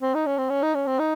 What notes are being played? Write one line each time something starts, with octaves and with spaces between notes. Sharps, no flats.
C4
D#4
C#4
C4
C#4
D#4
C#4
C4
D#4